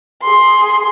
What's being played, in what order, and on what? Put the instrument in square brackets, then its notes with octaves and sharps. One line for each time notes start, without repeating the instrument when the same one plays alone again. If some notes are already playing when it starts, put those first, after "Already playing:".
[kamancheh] G#4 C6